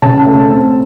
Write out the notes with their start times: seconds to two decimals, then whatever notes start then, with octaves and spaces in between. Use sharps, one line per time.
0.02 C#3 A5
0.26 A3
0.50 C4